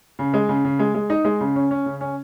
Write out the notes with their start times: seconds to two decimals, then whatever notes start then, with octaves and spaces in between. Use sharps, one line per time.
0.19 C#3
0.34 G#3
0.49 C#3
0.65 C#3
0.79 G#3
0.94 G#3
1.10 D#4
1.25 G#3
1.41 C#3
1.56 C#4
1.71 C#4
1.86 C#3
2.01 C#4